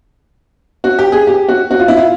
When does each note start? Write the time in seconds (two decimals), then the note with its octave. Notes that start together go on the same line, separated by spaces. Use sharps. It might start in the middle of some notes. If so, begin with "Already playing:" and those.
0.84 F#4
0.99 G4
1.12 G#4
1.27 G4
1.48 F#4
1.71 F#4
1.80 F4
1.88 E4
1.97 F4